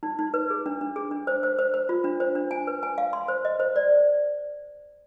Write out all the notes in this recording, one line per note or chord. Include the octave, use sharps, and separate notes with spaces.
D#4
D#4
B4
G#4
D4
D4
G#4
D4
C5
C5
C5
C5
F4
D4
C5
D4
G#5
B4
G#5
F5
C6
C5
D#5
C5
D5